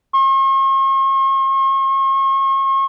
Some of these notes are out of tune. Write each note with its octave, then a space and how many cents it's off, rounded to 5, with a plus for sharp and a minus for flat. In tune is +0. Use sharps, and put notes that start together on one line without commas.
C#6 -45